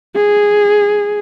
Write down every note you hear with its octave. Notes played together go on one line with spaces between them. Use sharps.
G#4